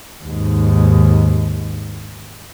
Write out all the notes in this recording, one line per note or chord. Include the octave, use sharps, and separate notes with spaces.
D#2 G#2